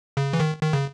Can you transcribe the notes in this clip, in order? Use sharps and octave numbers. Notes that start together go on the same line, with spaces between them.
C#3
E3
D#3
D#3
C#3